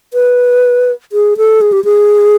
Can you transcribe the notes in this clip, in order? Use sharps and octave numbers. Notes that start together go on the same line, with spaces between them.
B4
G#4
A4
G#4
G4
G#4